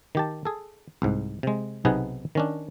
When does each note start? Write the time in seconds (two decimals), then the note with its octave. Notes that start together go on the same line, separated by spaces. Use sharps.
0.15 D#3 G4 A5
0.45 G#4 A4
1.02 C2 G#2
1.43 C3 G#3
1.85 B1 C3 B3 D#4 G#4 F#5
2.35 D#3 C#4 D4